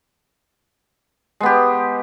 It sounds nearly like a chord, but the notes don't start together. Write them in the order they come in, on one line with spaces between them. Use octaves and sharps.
G#3 B3 G4